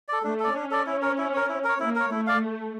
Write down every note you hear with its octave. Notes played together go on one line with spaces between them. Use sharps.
A4 D5
A3 D4
A4 D5
C#4 D4
A4 D5
E4
A#4 C#5
E4
A#4 C#5
E4
A#4 C#5
A#3 E4
A#4 C#5
A3 E4
D5 F5